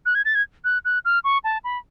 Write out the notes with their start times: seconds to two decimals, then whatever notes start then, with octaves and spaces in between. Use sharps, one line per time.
0.06 F#6
0.15 G#6
0.25 A6
0.35 G#6
0.64 F#6
0.85 F#6
1.05 F6
1.24 C#6
1.44 A5
1.64 B5